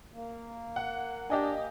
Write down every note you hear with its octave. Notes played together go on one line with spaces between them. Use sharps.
A#3
F#5
D4 G4 D#5 G#5